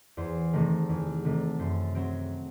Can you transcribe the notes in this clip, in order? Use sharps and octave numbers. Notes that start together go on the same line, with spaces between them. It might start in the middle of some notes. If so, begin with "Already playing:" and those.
E2 C5
C3 D#3 A3
E2
C3 D#3 A3
F#2 C5
F#3 C4